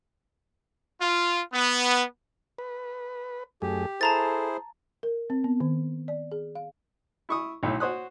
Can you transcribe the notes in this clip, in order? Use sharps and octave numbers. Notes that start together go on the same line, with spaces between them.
F4
B3
B4
F#2 A3 G4 G#4
E4 G#4 A4 C5 A5 A#5 A6
A#4
C4
B3
D#3
D5
G#4
F5
E4 C#6 D#6
B1 A2 E4
F#4 C5 C#5 D#6 F#6